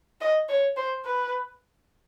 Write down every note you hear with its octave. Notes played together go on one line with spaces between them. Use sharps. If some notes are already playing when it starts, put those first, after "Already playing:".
D#5
C#5
C5
B4